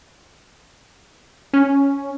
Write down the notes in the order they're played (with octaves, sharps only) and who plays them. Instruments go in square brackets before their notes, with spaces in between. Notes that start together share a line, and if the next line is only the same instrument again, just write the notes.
[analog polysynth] C#4